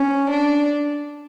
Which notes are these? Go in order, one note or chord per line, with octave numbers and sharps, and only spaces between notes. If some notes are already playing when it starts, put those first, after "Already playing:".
Already playing: C#4
D4